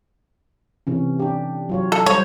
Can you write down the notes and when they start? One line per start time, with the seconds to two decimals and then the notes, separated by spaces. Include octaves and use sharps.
0.87 C3 E3 C#4
1.19 D4 G4
1.69 F#3 F4 C#5
1.92 A4
2.06 G3 C5 C#5